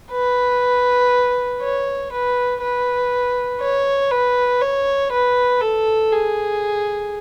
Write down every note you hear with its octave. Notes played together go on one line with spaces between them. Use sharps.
B4
C#5
B4
B4
C#5
B4
C#5
B4
A4
G#4